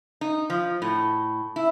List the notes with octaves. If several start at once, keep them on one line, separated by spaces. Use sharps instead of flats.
D#4
F3
A2
E4